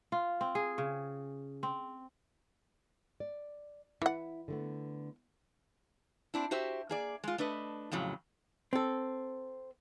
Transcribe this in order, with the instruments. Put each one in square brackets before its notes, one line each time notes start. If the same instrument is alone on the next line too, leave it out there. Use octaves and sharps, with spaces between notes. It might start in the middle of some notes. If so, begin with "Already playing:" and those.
[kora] F4
C4
G#4
C#3
C4
[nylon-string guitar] D5
[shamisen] E3 F#5 [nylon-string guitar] E4
[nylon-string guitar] D3 A3 B3
[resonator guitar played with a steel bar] C4 D4 E4
F#4 G4 C5 E5
A#3 G#4 D5
G#3 F4
A3 D4 B4 D#5
F2 A2 C#3 F#3
[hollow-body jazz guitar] C4 A4